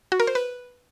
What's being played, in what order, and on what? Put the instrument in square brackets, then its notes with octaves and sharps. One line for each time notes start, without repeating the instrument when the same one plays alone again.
[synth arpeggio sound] F#4
A#4
C5
B4